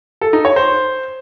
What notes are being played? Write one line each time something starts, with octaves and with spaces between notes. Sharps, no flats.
A4
D#4
C#5
C5